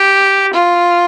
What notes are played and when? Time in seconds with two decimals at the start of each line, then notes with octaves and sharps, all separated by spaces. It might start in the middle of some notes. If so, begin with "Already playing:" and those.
Already playing: G4
0.53 F4